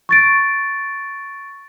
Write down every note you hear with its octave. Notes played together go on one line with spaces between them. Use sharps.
C#6 A6 D7